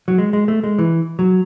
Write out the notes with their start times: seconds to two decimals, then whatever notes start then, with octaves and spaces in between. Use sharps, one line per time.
0.08 F#3
0.18 G#3
0.33 G#3
0.48 A3
0.64 G#3
0.79 E3
1.19 F#3